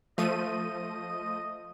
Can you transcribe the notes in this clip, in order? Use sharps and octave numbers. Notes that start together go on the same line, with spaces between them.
F3 A3 D#5 D#7